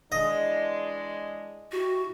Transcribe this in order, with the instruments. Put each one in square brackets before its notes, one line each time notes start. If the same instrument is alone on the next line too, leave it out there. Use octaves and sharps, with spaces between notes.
[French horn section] E3 G#3 D4 [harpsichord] D#5
[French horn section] E4 G4 [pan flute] F#4